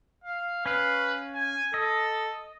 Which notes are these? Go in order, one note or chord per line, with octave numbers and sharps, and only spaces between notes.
F5
C#4 B4 F5
G#5
A4 D#5